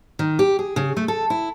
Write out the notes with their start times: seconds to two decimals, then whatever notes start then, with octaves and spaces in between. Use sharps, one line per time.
0.19 D#3
0.39 G4
0.59 G#4
0.76 C#3
0.97 A3
1.08 A4
1.30 E4